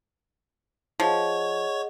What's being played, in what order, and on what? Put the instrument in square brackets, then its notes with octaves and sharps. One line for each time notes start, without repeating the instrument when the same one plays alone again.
[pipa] F3 [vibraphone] G#4 D#5 F#5 [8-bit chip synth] C#5 C#6